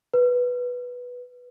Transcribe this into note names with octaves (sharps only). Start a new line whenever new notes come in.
B4